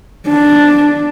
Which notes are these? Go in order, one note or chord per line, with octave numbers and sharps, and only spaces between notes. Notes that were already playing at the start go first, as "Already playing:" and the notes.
D4